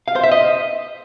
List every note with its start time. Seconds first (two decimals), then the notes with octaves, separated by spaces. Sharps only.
0.08 F5
0.16 C5
0.24 E5
0.32 D#5